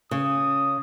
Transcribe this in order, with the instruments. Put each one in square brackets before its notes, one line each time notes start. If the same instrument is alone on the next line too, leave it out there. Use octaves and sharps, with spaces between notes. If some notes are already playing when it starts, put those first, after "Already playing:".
[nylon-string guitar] C#3 [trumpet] D#6